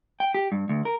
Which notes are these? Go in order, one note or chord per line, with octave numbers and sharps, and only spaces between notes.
G5
G4
G2
D2
A#4